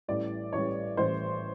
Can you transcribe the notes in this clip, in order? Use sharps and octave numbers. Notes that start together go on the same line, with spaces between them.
A1 A2 E3 G3 D5
A1 A2 E3 G3 C#5
A1 A2 E3 G3 C5